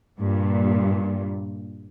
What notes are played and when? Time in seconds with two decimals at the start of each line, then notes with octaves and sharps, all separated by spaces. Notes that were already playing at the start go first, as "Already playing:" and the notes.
0.20 G2 A#2